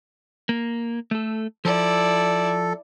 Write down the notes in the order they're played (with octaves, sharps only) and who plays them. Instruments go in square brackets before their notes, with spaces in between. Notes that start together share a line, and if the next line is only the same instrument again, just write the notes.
[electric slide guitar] A#3
A3 A4
[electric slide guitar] F3 [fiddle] E4 D5 [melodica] A4